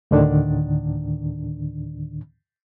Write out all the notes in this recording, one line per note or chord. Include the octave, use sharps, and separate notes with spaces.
D2 A2 D3 D#3 D4